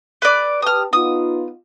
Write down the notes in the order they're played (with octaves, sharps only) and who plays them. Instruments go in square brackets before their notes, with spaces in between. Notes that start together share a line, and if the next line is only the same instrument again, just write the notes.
[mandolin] B4 D5
[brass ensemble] G4 B4 A5 [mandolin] D#6 F6
[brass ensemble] B3 D#4 F4 [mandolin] D#6